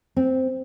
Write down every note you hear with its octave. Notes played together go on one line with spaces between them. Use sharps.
C4